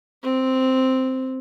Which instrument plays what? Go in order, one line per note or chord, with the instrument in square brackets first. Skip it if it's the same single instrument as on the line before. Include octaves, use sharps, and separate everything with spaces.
[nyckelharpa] C4